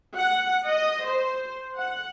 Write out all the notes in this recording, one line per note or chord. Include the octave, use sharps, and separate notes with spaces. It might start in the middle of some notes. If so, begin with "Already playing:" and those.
F#5
D#5
C5
F#5